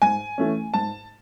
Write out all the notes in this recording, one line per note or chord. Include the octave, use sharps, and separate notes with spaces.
G#2 G#5
E3 A3 C#4
G#2 A5